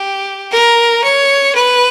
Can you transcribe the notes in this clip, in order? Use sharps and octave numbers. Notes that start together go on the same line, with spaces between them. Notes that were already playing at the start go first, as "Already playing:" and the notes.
Already playing: G4
A#4
C#5
B4